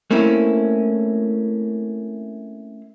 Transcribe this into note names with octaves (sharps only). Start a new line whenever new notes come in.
A3 A#3 C4 C#4 E4